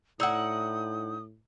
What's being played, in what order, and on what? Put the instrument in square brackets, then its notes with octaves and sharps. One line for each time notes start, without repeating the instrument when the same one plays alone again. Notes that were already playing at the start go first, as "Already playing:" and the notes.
[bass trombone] A2 [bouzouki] D#4 E4 F#5 [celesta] D5 E6 [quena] D#6